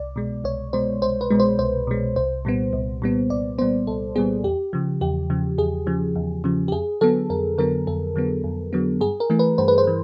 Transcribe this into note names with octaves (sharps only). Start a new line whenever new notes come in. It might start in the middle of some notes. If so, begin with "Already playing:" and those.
Already playing: C2 D5
B2 G#3
C2 C#5
B2 G#3 C5
C2 C5
B4
B2 G#3
C5
C2 C5
B2 G#3
C2 C5
A#2 G3 B3
C2
A#2 G3 B3
C2 D5
A#2 G3 B3 C5
C2 A4
A#2 G3 B3 G#4
E2 G4
C#3 F3
E2 G4
C#3 F3
E2 G#4
C#3 F3
E2
C#3 F3
G4
F2 G#4
D3 F#3 B3 A4
F2 A#4
D3 F#3 B3 A#4
F2 A4
D3 F#3 B3
F2
D3 F#3 B3
G2 G#4
A#4
E3 A3
B4
G2 C5
B4
C5
E3